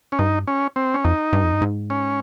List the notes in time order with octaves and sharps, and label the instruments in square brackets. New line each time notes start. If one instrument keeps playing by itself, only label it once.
[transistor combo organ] C#4
[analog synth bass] G2 [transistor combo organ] D#4
[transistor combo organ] C#4
C4
C#4
[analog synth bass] F2 [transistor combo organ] D#4
[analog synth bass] G2
F2
G2
G#2
[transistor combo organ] C#4